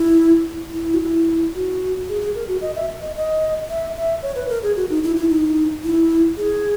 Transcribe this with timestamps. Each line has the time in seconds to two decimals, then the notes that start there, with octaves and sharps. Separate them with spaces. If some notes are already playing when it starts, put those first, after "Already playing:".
Already playing: E4
0.74 E4
0.94 F#4
1.01 E4
1.55 F#4
2.09 G#4
2.22 G#4
2.35 A#4
2.48 F#4
2.62 D#5
2.75 E5
3.02 D#5
3.16 D#5
3.69 E5
3.96 E5
4.22 C#5
4.36 B4
4.49 A#4
4.63 G#4
4.76 F#4
4.90 D#4
5.03 E4
5.16 E4
5.30 D#4
5.84 E4
6.37 G#4